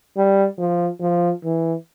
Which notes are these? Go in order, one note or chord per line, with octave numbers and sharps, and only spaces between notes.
G3
F3
F3
E3